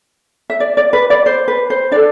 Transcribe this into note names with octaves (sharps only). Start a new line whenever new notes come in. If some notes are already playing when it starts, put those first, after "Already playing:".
E5
D5
D5
B4
D5
C5
B4
C5
D4 A4 D5